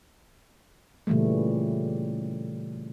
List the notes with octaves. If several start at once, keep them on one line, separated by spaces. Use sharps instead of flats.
A#2 C#3 E3 G3 A3